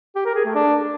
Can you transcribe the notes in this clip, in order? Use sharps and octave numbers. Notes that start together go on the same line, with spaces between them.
G4
A#4
G#4
A3
D4